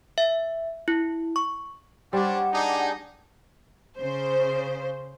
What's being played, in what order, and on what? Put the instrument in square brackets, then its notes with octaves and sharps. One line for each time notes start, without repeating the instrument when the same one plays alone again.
[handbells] E5
E4
C#6
[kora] G3 [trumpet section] C#4 D4 [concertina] C5 [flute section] F#5 D6
[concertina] D4 G4 G#4 [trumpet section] D#4
[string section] C#3 C5